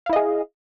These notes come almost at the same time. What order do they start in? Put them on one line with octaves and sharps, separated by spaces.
F5 E4 D#5 G#4